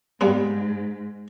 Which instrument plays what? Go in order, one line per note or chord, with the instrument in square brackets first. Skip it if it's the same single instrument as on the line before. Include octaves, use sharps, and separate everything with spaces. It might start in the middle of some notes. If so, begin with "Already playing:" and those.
[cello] G#2 [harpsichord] G3 A#3 B3